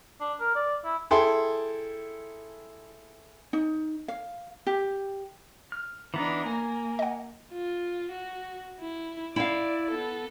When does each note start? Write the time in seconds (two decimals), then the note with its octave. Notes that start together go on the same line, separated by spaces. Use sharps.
0.20 D4
0.40 A#4
0.55 D5
0.84 E4
1.11 E4 G#4 A4 G5 C6
3.53 D#4
4.08 F5
4.67 G4
5.72 F6
6.14 E3 B3 D4 D#4 A#5
6.46 A#3 G#5
6.99 D#5 F#5
7.53 F4
8.11 F#4
8.81 E4
9.36 E4 D5 F5
9.91 B3 A4